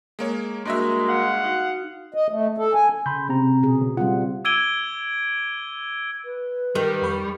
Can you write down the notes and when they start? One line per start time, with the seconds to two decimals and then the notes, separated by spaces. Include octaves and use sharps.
0.19 G#3 A#3 C#5
0.65 G2 G#3 A#3 F#4 A#4 D#5 E5
1.08 F5 F#5
1.44 D#4 F#4
2.14 D#5
2.30 A3
2.58 A4
2.74 G#5
3.06 C#3 B5 C6 G6
3.29 C3 C4 A#5
3.63 B2 G#4
3.82 C#3
3.97 G3 C4 F4 F#5
4.45 D6 E6 G#6 D7 D#7 G7
6.24 B4
6.75 D#3 G3
7.02 F2 B5 C#6